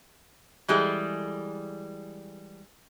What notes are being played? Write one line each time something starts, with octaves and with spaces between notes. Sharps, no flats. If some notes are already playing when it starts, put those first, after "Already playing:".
E3 G3 G#3 G#4 A4